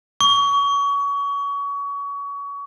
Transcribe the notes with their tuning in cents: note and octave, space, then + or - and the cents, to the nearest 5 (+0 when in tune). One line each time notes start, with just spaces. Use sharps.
C#6 +30